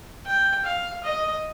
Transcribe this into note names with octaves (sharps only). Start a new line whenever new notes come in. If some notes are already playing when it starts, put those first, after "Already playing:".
G5
F5
D#5